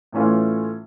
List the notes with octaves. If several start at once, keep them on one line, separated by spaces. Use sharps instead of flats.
A2 E3 A3 C#4 F4